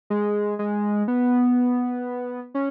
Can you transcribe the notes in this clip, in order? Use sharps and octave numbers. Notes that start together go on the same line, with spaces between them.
G#3
G#3
B3
C#4